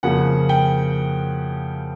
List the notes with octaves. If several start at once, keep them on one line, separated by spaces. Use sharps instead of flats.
F2 C#3 F3 A#3 F#5
G5